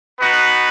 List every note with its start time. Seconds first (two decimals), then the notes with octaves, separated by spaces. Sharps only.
0.18 B3 D#4 F#4 B4